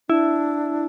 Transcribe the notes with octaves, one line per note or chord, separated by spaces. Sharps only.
D4 E4